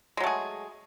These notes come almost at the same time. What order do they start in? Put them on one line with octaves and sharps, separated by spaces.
G#3 F#3 A3 G#4